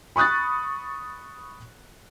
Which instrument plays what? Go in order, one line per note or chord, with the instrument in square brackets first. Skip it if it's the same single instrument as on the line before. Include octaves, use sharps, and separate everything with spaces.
[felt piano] B5 C#6 D#6 F#6 A6